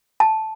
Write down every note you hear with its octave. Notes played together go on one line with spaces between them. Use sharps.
A5